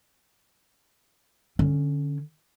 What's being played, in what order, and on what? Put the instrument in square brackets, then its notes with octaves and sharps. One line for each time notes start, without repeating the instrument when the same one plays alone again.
[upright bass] D3 C#4